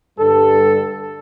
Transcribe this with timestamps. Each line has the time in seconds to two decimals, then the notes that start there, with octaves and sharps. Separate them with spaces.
0.17 G2 D3 G3 A4